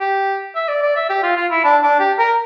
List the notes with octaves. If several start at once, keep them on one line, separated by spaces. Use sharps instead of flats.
G4
E5
D5
D5
E5
G4
F4
F4
E4
D4
D4
G4
A#4